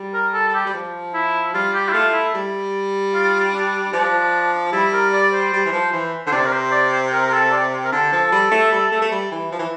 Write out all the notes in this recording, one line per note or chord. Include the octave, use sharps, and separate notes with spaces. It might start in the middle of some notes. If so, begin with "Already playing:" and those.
Already playing: G3
A#4
A4
A4
G4
G3
F3
E4
G3 F4
G4
E4
A3 F4
E4
G3
F4
D4
F3 D4
G3 E4
A#4
D5
C5
G3
E3
F3
E3
D3 C5
C3 D5
A#4
C5
D5
C5
A#4
A#4
A4
D5
A#4
D3 A4
F3
G3
A3
G3
A3
A3
G3
E3
F3
E3